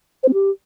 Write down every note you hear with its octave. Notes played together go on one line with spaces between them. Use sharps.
C5
C4
G4